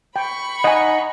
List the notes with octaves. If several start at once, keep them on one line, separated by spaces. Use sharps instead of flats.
G5 B5 C#6
D#4 D#5 F#5 G#5